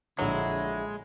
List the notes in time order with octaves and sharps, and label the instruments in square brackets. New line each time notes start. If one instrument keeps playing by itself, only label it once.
[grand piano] A#1 F7 [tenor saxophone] D3 [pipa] F#3 E4 [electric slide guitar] G#3